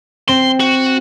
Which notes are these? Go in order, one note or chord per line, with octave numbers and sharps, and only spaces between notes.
C4 C6
F#4